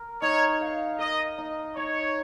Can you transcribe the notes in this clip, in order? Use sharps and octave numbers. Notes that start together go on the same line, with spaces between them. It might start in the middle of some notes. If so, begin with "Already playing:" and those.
Already playing: A#4
D#4 C#5
F5
A#4 D#5
D#4
D#4 C#5